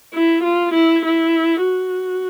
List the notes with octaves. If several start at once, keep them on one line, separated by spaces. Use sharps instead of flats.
E4
F4
E4
E4
F#4